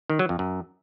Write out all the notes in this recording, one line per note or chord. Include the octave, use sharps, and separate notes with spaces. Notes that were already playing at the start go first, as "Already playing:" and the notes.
D#3
F#3
F2
F#2